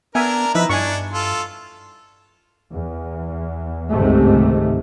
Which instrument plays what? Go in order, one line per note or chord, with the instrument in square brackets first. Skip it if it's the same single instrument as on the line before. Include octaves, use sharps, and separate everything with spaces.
[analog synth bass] B3 [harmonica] D4 A#4 [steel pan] E5 G#5
[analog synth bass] F3 [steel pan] D#4 E4 E5 [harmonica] B4
[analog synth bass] G2 [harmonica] D4 [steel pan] G#5 C#6
[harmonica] F4 A4
[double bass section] E2
G1 C#2 G#2 C3 D#3 A3